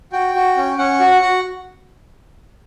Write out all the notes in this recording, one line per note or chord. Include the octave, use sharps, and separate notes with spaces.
F#4 G5
F#4
C#4
C#4 F#5
F#4
F#5
F#4